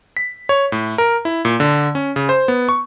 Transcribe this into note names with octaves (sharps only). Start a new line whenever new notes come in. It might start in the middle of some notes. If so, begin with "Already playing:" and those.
B6
C#5
A2
A#4
E4
A#2
D3
C#4
C#3
C5
B3
C#6